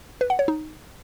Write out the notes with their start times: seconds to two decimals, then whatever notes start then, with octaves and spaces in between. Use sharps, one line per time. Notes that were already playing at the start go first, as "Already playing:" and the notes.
0.21 B4
0.30 F#5
0.39 C#5
0.48 D#4